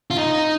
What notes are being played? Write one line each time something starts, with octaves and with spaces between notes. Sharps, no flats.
F4
D#4